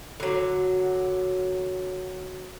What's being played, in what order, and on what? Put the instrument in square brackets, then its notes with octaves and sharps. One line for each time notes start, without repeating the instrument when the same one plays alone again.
[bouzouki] D3 F#3